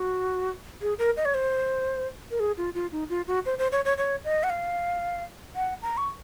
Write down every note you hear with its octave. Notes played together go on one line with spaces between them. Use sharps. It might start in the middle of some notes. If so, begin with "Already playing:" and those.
Already playing: F#4
G#4
A#4
D#5
C#5
C5
A#4
G#4
F4
F4
D#4
F4
F#4
C5
C5
C#5
C#5
C#5
D#5
F#5
F5
F#5
A#5
C#6